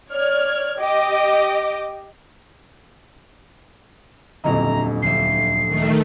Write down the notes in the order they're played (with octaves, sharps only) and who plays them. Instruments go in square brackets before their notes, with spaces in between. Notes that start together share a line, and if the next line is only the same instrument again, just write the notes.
[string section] C#5 D5 F6 G#6
G4 D#5 D6
[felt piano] D#1 F2 D#5 [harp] D3 F#3 E4 [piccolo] A#5
[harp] D2 F3 E5 [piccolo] C7
[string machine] D#3 A3